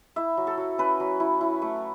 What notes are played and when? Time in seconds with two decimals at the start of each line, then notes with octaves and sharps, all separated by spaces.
0.16 E4 E5
0.37 F#3
0.47 A4
0.58 F#3
0.78 C#4 B4
1.00 F#3
1.20 E4
1.41 E4
1.62 A3